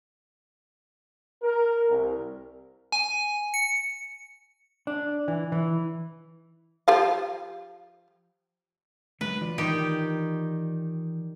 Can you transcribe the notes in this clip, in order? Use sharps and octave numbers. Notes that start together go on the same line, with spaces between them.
A#4
C2
G#5
C#7
D4
E3
E3
F3 G4 F5
D3 F#3 G#3 B4
E3 F4 D5
D#3 D#4 G4